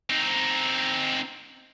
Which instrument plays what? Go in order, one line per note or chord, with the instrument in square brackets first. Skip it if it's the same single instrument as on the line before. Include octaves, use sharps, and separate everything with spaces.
[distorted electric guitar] C4 D#4